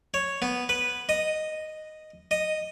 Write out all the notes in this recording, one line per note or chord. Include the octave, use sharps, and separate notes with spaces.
C#5
B3
B4
D#5
D#5